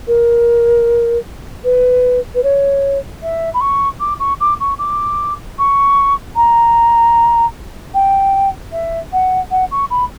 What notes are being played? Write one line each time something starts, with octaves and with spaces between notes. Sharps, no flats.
A#4
B4
B4
C#5
E5
B5
C#6
D6
C#6
D6
C#6
D6
C#6
A#5
G5
E5
F#5
F#5
C#6
B5